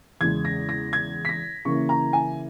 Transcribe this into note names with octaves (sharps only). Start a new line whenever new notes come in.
E2 C#3 G#3 G#6
A#6
A#6
G#6
B6
A#6
C#3 E3 A#3 C#4 E4 C#6
A#5
G#5